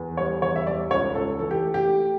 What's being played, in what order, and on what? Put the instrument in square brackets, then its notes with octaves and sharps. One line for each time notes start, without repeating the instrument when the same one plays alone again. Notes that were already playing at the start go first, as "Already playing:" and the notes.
Already playing: [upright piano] E2
[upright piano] G3 [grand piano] C#5
[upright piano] E2 [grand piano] C#5
[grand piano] E5
[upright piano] G3 [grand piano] D5
[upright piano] C#2 [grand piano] C#5
[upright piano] C#2 [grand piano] A4
[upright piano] E3 [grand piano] A4
[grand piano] G4
[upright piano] A3
[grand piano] G4
[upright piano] A3